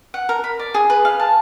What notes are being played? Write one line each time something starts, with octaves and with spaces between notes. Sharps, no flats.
F#5
A#4
B5
D5
G#4
B4
F5
A5